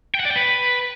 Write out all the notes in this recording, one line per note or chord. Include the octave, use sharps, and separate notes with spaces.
G5
F#5
D5
G5
B4